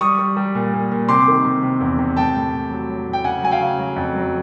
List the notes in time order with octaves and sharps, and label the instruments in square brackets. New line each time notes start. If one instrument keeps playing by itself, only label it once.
[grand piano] G3 C#6 D#6
G3
G3
A#2
A#2
A#2
C3 C6 D6
D#3
C3
C3
E2
C3
A2 G5 A5
A2
A2
F#3
F#3
A2
G5
C#3 F#5 G#5
F#3 G#5
F5 G5
C#3
F#3
F2
F#3